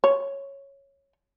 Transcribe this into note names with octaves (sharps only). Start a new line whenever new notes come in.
C#5